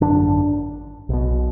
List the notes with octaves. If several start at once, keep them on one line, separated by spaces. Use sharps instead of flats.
G#1 F#2 D3 D4
B1 B2